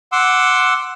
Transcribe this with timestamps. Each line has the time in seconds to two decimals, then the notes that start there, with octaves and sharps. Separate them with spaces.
0.12 F#5 C6 D6 E6